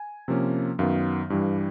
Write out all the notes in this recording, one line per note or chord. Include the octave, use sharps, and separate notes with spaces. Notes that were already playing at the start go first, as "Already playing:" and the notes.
Already playing: G#5
C3 F3 A#3 C#4
F#2 D#3 F#3 B3 F5
G2 E3 G3